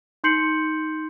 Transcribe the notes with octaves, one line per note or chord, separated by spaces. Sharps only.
D#4 C6 G6 C7 C#7 F#7